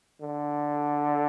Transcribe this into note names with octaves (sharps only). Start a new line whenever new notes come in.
D3